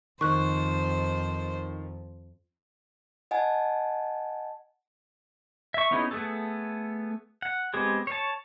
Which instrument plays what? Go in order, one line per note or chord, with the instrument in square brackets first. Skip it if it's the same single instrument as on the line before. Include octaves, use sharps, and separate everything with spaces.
[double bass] F2 [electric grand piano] D#3 [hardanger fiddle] C5 [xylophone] C#6 F#6
[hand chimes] D#5 F#5 G#5 A5
[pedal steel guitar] E5 C#6
B3 C#4 D#4 E4 G#4
A3 B3 G#4 A4
F#5
G#3 B3 C4 G4 G#4
C#5 A5